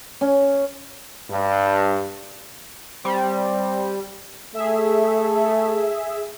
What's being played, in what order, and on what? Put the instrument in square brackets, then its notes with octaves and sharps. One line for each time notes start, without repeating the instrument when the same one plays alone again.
[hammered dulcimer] C#4
[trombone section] G2
[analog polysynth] G3 [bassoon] C4
[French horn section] A3 A4 [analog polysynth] G#4 E5